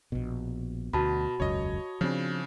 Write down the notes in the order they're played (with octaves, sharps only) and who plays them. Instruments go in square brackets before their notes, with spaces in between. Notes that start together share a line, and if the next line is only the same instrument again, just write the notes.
[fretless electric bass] A#1 B2
[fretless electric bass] D2 [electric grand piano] B2 [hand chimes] F#4 A5 B5
[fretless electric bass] E1 C#2 F#2 [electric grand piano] C#5 D#5
[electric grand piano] C#3 D4 [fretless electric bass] F3 C4